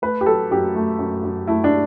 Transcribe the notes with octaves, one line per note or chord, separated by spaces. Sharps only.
A3 B4
G4
F#3 A4
F#2 G4
A3
F#2
F#2
A3 E4
D4